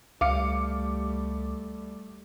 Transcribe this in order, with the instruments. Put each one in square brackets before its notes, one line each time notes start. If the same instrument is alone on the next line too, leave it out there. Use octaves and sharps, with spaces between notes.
[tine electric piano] C#2 [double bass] G3 A3 [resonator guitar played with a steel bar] F5 [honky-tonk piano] D6 C#7